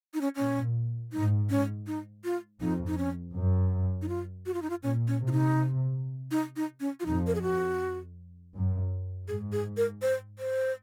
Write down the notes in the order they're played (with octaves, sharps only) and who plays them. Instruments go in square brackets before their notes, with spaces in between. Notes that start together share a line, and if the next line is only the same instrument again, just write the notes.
[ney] D#4
C#4
[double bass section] A#2 [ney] C#4
[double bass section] G#2 [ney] D#4
[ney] C#4
D#4
F4
[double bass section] F2 [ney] D#4
[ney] D#4
C#4
[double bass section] F#2
[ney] D#4
F4
F#4
F4
D#4
F4
[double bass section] A#2 [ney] C#4
[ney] C#4
[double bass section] C3
[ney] F4
D#4
D#4
D#4
C#4
F4
[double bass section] F2 [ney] D#4
[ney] A#4
G#4
F#4
[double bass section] F#2
[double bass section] G#2 [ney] G#4
[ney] G#4
A#4
C5
C5